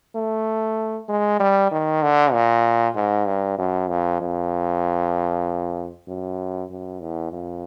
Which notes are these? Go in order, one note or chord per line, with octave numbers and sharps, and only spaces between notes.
A3
G#3
G3
D#3
D3
A#2
G#2
G2
F#2
F2
F2
F#2
F#2
E2
F2